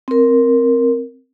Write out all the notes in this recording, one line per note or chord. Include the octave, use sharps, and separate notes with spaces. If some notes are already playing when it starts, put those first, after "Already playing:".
C4 A#4